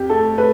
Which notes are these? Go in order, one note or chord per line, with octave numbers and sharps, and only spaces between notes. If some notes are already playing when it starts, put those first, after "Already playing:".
Already playing: F2 G4
A3 A4
A3 B4